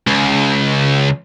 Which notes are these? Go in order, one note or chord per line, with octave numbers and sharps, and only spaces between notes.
C#2